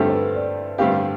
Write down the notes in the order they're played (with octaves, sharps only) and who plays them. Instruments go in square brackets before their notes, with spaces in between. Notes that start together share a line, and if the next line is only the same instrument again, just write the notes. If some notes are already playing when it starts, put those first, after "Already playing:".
Already playing: [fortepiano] G2 D3 A3 C4 G4 [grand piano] A4 E5
[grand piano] C5
B4
D5
[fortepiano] G2 D3 A3 C4 G4 [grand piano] F5